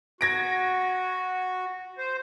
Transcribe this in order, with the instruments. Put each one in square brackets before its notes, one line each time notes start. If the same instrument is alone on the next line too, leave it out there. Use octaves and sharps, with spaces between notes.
[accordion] F#4 [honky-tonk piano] G#6 A#6 D7
[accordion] C5